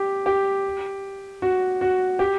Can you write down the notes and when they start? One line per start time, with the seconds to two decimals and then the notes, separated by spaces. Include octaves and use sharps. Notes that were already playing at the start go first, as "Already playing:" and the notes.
Already playing: G4
0.26 G4
1.42 F#4
1.81 F#4
2.19 G4